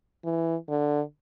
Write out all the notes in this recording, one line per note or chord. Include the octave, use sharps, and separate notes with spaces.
E3
D3